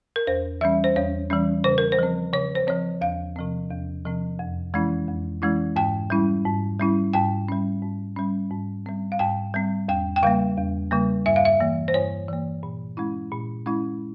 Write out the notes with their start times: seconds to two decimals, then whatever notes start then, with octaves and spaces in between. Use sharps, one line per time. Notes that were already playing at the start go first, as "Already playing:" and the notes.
0.16 A#4
0.27 E2 C5
0.61 E3 G3 C#4 E5
0.84 C5
0.96 E2 C#5
1.30 E3 G3 C#4
1.64 C#3 C5
1.78 A#4
1.92 C5
1.99 F3 C4
2.33 C#3 C#5
2.55 C5
2.67 F3 C4 C#5
3.01 E2 F5
3.36 C3 F3 C4
3.71 E2
4.05 C3 F3 C4
4.39 F2
4.74 E3 G#3 C#4 E4
5.08 F2
5.42 E3 G#3 C#4 E4
5.76 G#2 G5
6.10 G3 C#4 E4
6.45 G#2
6.80 G3 C#4 E4
7.13 G#2 G5
7.48 G3 C#4
7.82 G#2
8.17 G3 C#4
8.51 G#2
8.86 G3 C4
9.12 F5
9.19 G#2 G5
9.54 G3 C4
9.88 E2 G5
10.16 G5
10.23 C#3 G3 A#3 F5
10.57 E2
10.91 C#3 G3 A#3
11.26 G2 E5
11.36 F5
11.45 E5
11.60 E3 A#3
11.88 C5
11.94 G2 C#5
12.29 E3 A#3
12.63 A#2
12.97 G#3 C#4 E4
13.32 A#2
13.66 G#3 C#4 E4